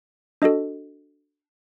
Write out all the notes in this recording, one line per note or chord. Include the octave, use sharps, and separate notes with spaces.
D4 F#4 A4 D#5